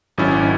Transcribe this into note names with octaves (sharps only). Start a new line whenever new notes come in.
G#1 G#2 F#3 C#4 E4